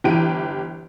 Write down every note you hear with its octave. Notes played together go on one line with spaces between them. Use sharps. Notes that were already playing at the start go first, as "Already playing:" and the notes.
G1 E3 G4 D7 D#7